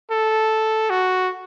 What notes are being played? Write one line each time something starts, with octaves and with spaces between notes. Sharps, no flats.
A4
F#4